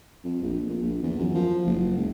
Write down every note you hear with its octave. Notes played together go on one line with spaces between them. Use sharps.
F2
A#1
A#2
A#1
E2
F#2
F3
F#1
C#2